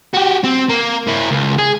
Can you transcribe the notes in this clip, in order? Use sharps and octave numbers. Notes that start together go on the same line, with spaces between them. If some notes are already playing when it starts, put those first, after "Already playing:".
F#4 G4
C4
A#3
A#3 E4
C#2
G#4